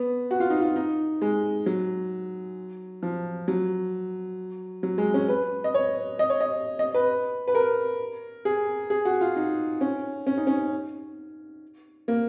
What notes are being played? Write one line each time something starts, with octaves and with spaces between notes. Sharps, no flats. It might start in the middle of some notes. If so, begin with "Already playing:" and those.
Already playing: B3
F#4
F4
D#4
F4
D#4
G#3
F#3
F3
F#3
F#3
G#3
C#4
B4
D#5
C#5
D#5
C#5
D#5
D#5
B4
B4
A#4
G#4
G#4
F#4
F4
D#4
C#4
C#4
D#4
C#4
A#3